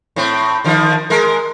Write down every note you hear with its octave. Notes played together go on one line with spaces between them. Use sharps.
A2 C4
D3 D#3 F3
G#3 A#4